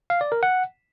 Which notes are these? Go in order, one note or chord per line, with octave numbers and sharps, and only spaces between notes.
F5
D5
A#4
F#5